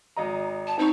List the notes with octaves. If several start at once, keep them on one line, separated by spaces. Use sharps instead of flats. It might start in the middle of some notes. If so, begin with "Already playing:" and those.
G#1 D#5 A#5
A5
C4 D#4 C#6